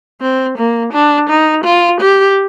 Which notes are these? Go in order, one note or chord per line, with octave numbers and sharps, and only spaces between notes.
C4
A#3
D4
D#4
F4
G4